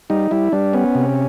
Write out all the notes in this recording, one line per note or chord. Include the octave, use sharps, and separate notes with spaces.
G3 D#4
G3 E4
G3 D4
B3 C#4
C3